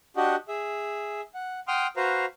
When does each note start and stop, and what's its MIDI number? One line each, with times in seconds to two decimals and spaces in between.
0.17 0.36 62
0.17 0.36 66
0.17 0.36 67
0.17 0.36 75
0.17 0.36 78
0.48 1.21 68
0.48 1.21 76
1.34 1.60 78
1.68 1.87 78
1.68 1.87 79
1.68 1.87 84
1.68 1.87 87
1.68 1.87 89
1.97 2.26 66
1.97 2.26 71
1.97 2.26 72
1.97 2.26 77
1.97 2.26 82